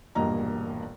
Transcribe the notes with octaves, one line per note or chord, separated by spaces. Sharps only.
E1 A#1 G2 A#3 D#5 A#5